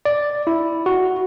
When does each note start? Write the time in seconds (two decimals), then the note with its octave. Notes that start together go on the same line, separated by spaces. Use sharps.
0.05 D5
0.47 E4
0.86 F#4